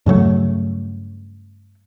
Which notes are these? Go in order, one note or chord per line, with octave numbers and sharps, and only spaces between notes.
G2 C#3 F#3 A3